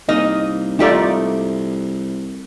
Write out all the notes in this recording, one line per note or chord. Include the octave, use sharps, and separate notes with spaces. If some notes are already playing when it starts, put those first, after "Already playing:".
C2 A#3 D#4 D#5
A3 D#4 F4 G4 A4 D5